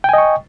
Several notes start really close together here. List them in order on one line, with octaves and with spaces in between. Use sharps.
G5 G#5 D#5 C#6